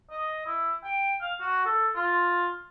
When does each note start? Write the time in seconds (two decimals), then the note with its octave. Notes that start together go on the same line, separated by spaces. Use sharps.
0.11 D#5
0.46 E4
0.84 G5
1.21 F5
1.41 F#4
1.65 A4
1.96 F4